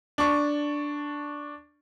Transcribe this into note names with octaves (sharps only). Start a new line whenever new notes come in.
D4 C#6